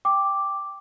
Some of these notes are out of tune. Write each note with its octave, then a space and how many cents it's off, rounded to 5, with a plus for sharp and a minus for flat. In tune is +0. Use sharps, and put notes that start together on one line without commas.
G5 +5 D6 +0